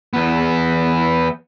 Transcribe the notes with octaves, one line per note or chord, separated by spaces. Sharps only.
E2 B3